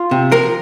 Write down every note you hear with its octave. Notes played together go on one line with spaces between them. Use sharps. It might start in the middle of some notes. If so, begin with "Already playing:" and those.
Already playing: F4
C3
F3 A#4